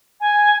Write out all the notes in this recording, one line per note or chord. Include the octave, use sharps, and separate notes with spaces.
G#5